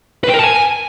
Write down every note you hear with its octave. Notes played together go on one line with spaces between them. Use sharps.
B4
G5
A#4
A5
G#5